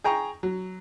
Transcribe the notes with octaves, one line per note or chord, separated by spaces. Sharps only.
G#4 G5 A#5 C#6
F#3